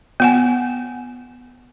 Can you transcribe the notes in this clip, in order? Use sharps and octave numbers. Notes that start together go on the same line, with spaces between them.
B3 F#5 G#5